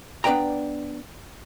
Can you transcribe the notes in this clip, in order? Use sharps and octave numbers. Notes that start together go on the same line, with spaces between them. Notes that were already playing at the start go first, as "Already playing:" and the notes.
B3 D4 B4 D5 G5 A#5